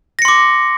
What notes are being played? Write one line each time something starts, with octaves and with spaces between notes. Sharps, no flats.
C6 D6 A#6 C#7